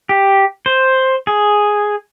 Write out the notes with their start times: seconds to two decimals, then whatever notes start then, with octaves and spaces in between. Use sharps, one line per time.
0.09 G4
0.66 C5
1.27 G#4